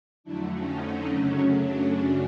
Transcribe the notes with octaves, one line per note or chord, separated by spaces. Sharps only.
F2 D3 F#3 A3 D4 E4
C#4 D#4
D4
F#2 C#3 F#3 A3 C#4
D4